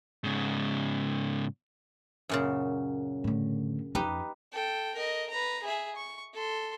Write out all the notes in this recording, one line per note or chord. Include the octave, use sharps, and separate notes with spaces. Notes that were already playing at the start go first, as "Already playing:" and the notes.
G#2 C#3
F#2 A#2 C#3
A2 D3
F2 C#4 D#4 G4 B4
A4 G5
A#4 D#5
B4 A#5
G#4 E5
C#6
A4 C6